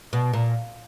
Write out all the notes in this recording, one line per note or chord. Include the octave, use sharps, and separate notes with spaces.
B2
A#2